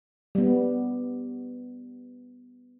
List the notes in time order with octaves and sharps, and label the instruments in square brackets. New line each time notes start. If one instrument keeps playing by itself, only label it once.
[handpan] G3 B3